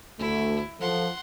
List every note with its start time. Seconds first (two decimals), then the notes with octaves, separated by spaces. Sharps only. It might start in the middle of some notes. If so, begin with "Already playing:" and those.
0.19 D2 A3 E4
0.80 F3 A4 F#5 C6